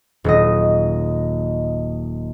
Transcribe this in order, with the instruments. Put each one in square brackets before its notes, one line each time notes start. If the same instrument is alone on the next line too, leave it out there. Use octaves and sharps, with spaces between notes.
[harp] D#1 F#3 D#5